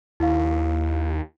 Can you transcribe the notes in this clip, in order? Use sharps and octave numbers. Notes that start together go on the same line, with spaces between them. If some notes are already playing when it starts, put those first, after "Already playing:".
D#2 E4 F5